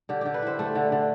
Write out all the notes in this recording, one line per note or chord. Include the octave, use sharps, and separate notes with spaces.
D3 G4
D3 G4
B4
E4 C5
A3
D3
D3